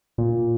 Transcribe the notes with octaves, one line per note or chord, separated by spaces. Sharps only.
A#2